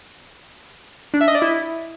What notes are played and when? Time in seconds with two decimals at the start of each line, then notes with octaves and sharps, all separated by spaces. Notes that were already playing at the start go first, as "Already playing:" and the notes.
1.14 D4
1.21 E5
1.28 D#5
1.35 D5
1.42 E4